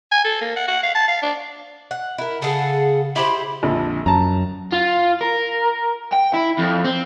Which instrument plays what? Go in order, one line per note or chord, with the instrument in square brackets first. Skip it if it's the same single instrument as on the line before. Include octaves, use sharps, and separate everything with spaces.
[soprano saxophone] G#5
A4
A#3
F#5
F#5
F5
A5
F5
D4
[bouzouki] F#5
E4 A#4
[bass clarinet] C#3 [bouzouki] G#4 A4 [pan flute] F#5
[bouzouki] E4 G4 C5 [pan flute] B5
[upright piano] A#1 F2 D3
[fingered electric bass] F#2 [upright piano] A5 A#5
[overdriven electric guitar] F4
A#4
G5
E4
F2
C4